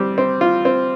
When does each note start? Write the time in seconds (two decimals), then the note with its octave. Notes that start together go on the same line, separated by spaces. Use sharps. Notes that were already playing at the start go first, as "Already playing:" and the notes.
Already playing: G3 C4
0.18 C4
0.41 F4
0.65 C4